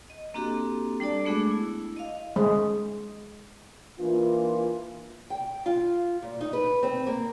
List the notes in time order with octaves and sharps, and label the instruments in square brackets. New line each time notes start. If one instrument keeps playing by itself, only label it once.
[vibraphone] D#5
A#3 C4 D4 F#4 G4 A4
G3 D4 A4 D5 A5
G#3 A3 B3 D4 F#4 G#4
E4
D#5 F5
[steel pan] G#3
[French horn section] E3 A#3 D4 F4
[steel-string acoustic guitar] G5
F4
A#2
D#4
B4
C4
A#3